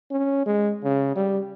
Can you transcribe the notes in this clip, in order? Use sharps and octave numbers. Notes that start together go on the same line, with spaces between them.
C#4
G#3
C#3
G3